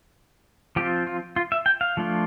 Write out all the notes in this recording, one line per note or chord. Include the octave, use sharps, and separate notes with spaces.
F3 C4 F4 G4
F4
F4
E5
G5
F5
F3 A3 D4 F4